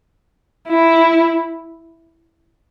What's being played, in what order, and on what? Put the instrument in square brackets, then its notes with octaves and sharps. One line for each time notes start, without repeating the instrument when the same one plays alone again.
[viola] E4